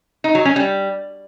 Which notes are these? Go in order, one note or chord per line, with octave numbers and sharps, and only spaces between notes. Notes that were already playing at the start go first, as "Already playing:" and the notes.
D#4
F#3
C#4
G3